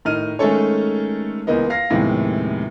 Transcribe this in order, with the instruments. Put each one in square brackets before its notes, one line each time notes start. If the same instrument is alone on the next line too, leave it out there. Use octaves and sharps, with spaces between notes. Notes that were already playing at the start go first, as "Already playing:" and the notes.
[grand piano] A2 D#3 D#5 F6 D#7
D#3 G#3 A3 C#4 A4 C#5
C#2 E3 A#3 B3 D#5
F5 A#6
D#2 A2 C3 F3 G#3 B3